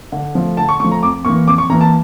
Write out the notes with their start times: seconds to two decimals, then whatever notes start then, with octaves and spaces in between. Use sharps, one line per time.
0.12 D3
0.35 F3 A3
0.57 D3 A5
0.69 C#6
0.79 A3 C#6
0.84 F3
0.92 A#5
1.03 F2 D6
1.25 E3 A#3 C#6
1.47 F2 D6
1.58 C#6
1.70 E3 A#3 A#5
1.81 A5